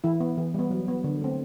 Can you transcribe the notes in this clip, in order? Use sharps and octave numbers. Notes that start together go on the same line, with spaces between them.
E3 E4
B3
E3
G3 B3
F#3
B3
D3
A3 C4